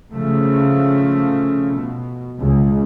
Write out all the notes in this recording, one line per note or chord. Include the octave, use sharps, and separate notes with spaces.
C#3 F3 A3
B2
C#2